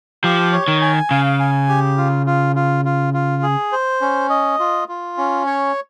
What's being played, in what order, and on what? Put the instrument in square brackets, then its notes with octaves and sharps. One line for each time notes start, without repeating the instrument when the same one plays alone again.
[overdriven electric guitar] F3 [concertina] G4
[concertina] C#5
[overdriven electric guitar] D#3
[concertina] G#5
[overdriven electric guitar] C#3 [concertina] F5
[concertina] G#5
G4
F4
F4
F4
F4
F4
G#4
C5
C#4
D#5
F4
F4
C#4
C#5